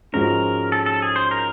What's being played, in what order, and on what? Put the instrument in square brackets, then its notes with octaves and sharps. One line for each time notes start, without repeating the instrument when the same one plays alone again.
[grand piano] G#2 F3 G#3 C#4 F#4 [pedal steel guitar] A#4
[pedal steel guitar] A4
A4
G#4
C5
A#4